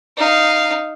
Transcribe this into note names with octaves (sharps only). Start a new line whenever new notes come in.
D#4 F5